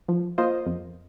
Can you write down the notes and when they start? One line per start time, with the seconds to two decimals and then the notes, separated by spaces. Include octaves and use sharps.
0.08 F3
0.38 A#3 F4 C5 D#5
0.66 F2